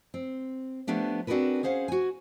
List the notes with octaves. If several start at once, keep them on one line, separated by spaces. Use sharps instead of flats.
C4
F3 A3 B3 D4 G4
C4 D4 F#4 G#4 A#4 B4
C#4 G#4 C5 F5 F#5
F#4 G#5